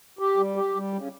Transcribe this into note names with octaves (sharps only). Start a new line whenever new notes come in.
G4
G3
G4
G3
C#3